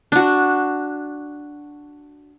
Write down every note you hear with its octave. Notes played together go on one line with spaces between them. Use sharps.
D4 F#4